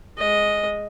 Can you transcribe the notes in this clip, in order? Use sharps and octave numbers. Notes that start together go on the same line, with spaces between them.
G#3 D#5